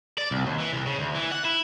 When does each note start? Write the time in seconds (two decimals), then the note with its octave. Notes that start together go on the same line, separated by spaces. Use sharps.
0.18 D5
0.31 C2
0.46 D#2
0.60 E3
0.73 C2
0.87 C#3
0.99 D2
1.15 E3
1.32 F#5
1.45 E4